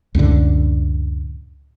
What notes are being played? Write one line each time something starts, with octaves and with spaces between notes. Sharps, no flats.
C#2 F#2 A2 D3